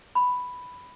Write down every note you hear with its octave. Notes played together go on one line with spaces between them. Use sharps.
B5